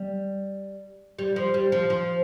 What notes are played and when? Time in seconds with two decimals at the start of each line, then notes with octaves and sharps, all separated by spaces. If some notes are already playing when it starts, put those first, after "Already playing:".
Already playing: G3
1.19 G3
1.36 F3
1.54 G3
1.72 F3
1.90 F3